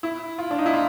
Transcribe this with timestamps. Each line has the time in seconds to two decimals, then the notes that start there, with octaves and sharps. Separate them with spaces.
0.03 E4
0.38 F4
0.51 D4
0.58 D#4
0.66 E4
0.73 F4